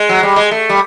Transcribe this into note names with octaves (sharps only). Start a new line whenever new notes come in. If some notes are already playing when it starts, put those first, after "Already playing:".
Already playing: G#3
F#3
G3
G#3
A3
G3